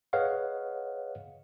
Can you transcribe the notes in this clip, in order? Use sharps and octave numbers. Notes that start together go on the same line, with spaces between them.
G#4 B4 C#5 D#5 F5 F#5